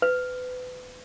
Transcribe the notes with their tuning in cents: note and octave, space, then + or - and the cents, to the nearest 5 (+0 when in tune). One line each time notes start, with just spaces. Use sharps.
B4 +30